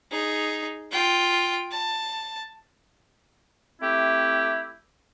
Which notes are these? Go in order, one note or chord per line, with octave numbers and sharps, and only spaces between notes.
D#4 G#4
F4 G5
A5
A3 C4 E4 G4